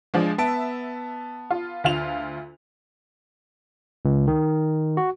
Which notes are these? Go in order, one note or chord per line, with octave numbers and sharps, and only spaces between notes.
F3 G#3 D4
B3 E5 A5 D7
F4
D2 F4 F7
C#2
D#3
F#4